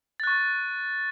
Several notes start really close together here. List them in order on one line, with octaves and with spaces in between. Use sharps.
A6 F#6 C#6